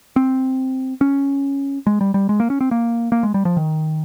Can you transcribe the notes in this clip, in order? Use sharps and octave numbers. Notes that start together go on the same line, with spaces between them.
C4
C#4
G#3
G3
G3
G#3
A#3
C#4
C4
A#3
A#3
G#3
G3
F3
D#3